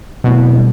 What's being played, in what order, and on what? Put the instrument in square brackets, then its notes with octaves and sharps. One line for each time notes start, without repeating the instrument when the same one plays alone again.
[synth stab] B2 [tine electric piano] F#3 A3 C4 E4
[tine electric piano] G3 A#3 D4